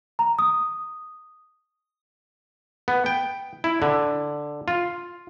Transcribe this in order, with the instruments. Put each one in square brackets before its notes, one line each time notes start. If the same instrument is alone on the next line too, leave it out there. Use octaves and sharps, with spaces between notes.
[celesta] A#5
D#6
[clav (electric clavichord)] B3
G5
E4
D3
F4